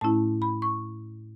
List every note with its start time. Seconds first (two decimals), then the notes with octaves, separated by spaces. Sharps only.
0.01 A2 A3 C#4 E4 A5
0.42 B5
0.62 C#6